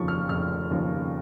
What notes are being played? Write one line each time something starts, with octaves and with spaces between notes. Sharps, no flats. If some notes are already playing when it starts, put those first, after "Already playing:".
Already playing: F1 D#2 C#3 F3 C#6
F6
F1 F6
D#2 C#3 F3